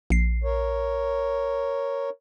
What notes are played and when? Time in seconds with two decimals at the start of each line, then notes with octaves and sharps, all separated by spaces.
0.10 A#1 C7
0.44 A#4 C#5